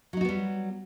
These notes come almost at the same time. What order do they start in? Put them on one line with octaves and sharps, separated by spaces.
F#3 D#4 F#4 B3 G3